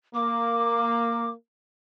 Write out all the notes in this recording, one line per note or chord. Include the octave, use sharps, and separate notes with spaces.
A#3 D6